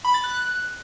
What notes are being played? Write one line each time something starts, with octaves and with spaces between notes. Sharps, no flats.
B5
A6
F#6